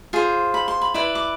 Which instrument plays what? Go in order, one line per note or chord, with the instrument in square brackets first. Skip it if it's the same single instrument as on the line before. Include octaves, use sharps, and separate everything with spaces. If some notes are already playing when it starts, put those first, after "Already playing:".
[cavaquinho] F4 G#4 C5
B5
C6
B5
E4 B4 D5
D6